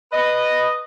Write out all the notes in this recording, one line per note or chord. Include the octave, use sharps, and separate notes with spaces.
B4 D#5